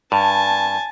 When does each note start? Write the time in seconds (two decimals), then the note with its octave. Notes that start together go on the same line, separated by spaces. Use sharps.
0.12 G2 G#5 A5